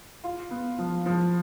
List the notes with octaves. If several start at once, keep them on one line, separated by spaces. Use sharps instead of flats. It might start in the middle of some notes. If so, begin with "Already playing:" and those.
F4
B3
F3
F3